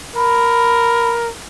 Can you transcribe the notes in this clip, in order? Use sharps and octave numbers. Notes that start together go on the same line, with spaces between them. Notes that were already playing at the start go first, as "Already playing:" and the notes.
A#4 B5